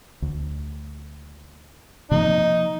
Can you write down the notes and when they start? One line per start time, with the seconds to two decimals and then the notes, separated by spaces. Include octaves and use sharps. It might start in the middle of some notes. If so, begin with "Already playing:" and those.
0.22 D2
2.11 C3 F3 A#3 D#4